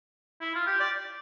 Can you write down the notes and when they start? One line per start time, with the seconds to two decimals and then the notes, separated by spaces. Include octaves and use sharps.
0.41 E4
0.55 F4
0.67 G4
0.80 D5